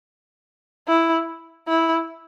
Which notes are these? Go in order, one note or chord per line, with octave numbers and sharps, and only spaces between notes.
E4
E4